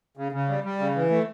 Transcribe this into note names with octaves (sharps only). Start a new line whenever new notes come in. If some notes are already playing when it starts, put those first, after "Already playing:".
C#3
C#3
G3
G3
C#3
E3
A3